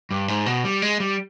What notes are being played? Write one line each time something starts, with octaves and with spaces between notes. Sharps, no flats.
G2
G#2
B2
G3
G#3
G3